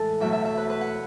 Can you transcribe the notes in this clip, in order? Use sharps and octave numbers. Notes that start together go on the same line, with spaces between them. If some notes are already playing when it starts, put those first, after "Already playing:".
Already playing: A2 E3 G#3 A4
E2 B2 F#3 A3 E5
E5
E5
B4
B4
F#5